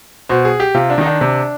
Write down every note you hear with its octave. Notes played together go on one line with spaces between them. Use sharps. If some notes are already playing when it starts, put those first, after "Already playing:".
B2 C5
G#4
G4
C3 F4
D4
D#3 D#4
D4
C3